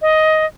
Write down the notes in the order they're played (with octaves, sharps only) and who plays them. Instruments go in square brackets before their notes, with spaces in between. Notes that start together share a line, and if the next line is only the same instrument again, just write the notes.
[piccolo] D#5